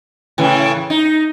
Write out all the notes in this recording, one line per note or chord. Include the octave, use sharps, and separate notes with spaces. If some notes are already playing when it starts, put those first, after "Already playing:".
A2 C#3 E3
D#4